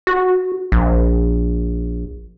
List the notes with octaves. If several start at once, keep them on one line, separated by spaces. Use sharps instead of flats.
F#4
A#1